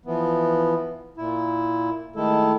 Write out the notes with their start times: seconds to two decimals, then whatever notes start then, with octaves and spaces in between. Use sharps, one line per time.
0.05 E3 F3 B3
1.17 A#2 E4
2.16 D#3 G#3 A3 E4 A4